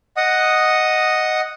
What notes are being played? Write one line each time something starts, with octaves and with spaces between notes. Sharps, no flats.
D#5 F#5 D#6